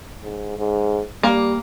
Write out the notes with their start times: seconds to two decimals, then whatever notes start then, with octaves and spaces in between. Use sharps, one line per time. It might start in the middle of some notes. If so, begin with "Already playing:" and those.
0.23 G#2
0.58 G#2
1.23 G3 A#3